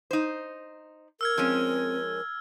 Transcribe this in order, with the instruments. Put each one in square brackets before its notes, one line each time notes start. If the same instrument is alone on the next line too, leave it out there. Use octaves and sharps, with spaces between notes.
[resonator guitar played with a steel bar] D#4 C5
[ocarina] A#4 [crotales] E6 F6 G#6
[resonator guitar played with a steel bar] F3 G#3 C#4 [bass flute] C4